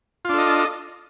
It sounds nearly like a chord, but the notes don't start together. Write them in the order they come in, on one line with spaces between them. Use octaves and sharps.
F4 D4 A4 D#5